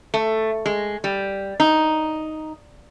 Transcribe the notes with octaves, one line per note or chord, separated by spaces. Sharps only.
A3
G#3
G3
D#4